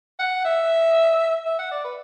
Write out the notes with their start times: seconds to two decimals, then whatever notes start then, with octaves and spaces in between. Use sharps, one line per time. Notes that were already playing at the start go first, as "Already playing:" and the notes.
0.19 F#5
0.45 E5
1.46 E5
1.59 F#5
1.71 D5
1.84 B4